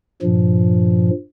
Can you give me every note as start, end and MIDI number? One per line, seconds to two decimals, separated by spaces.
0.22 1.10 43
0.22 1.10 46
0.22 1.10 53